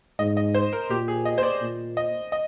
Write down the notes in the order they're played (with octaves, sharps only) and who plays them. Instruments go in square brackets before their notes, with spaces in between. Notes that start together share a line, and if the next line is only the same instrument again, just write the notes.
[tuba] G#2 [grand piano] D#5
[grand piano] D#5
C5
A#4
[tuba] A#2 [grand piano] G4
[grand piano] G#4
D#5
C5
D5
[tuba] A#2
[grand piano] D#5
D#5